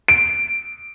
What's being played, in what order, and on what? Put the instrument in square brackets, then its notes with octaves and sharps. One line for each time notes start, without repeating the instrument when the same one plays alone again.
[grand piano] D7